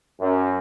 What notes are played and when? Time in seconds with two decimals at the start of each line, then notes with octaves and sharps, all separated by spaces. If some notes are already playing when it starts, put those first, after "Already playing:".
0.20 F#2